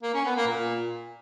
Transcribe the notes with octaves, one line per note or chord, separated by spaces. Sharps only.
A#3
C#4
B3
A#3
A#2